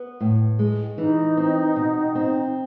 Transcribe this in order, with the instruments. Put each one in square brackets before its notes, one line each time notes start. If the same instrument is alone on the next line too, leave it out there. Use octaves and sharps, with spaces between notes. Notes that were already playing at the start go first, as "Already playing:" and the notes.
Already playing: [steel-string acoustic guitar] B3
A2
G#3
[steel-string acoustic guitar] E3 [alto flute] D#4
[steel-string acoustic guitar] C4
B2
C4